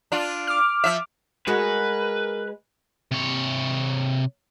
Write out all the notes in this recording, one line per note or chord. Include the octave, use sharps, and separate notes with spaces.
D4 F4
D6 F6
F3 E5
G#3 F#4 A#4 B4
C3 C#5